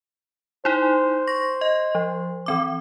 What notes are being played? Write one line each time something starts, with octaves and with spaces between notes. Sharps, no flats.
D#4 E4 C5
C#6 A#6
D#5
F3
E3 C4 D6